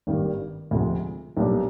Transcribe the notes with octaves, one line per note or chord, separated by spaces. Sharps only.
G#1 G2 D#3 G3 A#3
D2 C3 F3 G#3
B1 A#2 G3 B3 D4